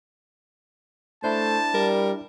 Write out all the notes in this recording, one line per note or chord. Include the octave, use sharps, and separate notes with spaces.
A3 D4 E4 C5 A5
G3 A#4